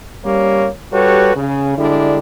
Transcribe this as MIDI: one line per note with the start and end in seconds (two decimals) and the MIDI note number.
0.25 0.68 55
0.25 0.68 58
0.25 0.68 61
0.25 0.68 73
0.92 1.34 55
0.92 1.34 66
0.92 1.34 67
0.92 1.34 69
0.92 1.34 71
0.92 1.34 73
1.35 1.75 49
1.77 2.19 50
1.77 2.19 55
1.77 2.19 56
1.77 2.19 62
1.77 2.19 64